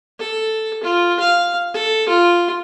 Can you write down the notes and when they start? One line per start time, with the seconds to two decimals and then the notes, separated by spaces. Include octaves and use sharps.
0.19 A4
0.83 F4
1.20 F5
1.74 A4
2.09 F4